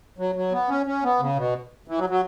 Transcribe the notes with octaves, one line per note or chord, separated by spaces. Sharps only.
F#3
F#3
B3
C#4
C#4
B3
C#3
B2
E3
F#3
F#3